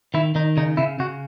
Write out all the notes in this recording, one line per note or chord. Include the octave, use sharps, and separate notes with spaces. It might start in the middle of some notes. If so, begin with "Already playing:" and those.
D#3 E4
D#3 D#4
C#3 D#4
C#3 E4
C#3 F#4